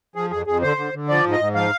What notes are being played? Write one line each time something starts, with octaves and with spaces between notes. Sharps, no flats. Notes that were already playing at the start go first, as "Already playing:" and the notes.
F3 G#4
F2 G#4
F2 G#4
D3 C5
D3
D3
F3 D5
G#2
D#5
G#2
F3 F5